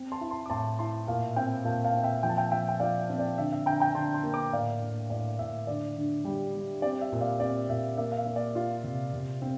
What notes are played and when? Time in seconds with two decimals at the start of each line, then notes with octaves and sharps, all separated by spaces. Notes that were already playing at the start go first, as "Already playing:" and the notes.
Already playing: C4
0.12 A5 C6
0.21 E4
0.31 A5 C6
0.46 D6
0.50 A2 A5 C6
0.79 E4 A5 C6
1.07 A#2 F5 A5
1.36 C4 E5 G5
1.65 A#2 F5 A5
1.84 F5 A5
1.94 C4
2.04 E5 G5
2.23 F3 G5
2.29 A5
2.37 E5 G5
2.51 F3 E5 G5
2.69 G5
2.80 F3 D5 F5
2.99 E5
3.10 C4
3.19 D5
3.38 D3 E5
3.52 E5
3.66 D3 G5 A#5
3.80 G5 A#5
3.95 D3 A5 C6
4.14 A5 C6
4.24 A#3
4.34 A#5 D6
4.53 A2 D5 F5
4.82 A2
5.10 A2 D5
5.39 A2 E5
5.67 D3 D5
5.96 D3
6.25 G3
6.55 G3
6.82 C4 D5
7.01 E5
7.12 A#2
7.21 D5 F5
7.40 C4 D5
7.69 A#2 E5
7.98 A#3 E5
8.12 F5
8.17 E5
8.26 A#3
8.36 D5
8.55 F4
8.84 C3
9.13 C3
9.42 C4